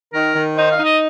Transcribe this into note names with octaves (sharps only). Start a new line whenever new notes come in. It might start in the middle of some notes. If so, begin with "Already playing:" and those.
D#3 A#4
D#3
D#4 C5
F5
D#4
D#5